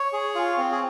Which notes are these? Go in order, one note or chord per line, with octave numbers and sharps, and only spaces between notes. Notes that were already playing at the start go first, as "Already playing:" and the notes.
Already playing: C#5
G#4
F4
C4
G#4